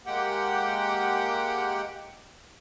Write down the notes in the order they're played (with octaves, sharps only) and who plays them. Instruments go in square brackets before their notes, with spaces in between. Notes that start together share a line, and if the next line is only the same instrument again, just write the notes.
[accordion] G#3 A#3 G4 F#5 G5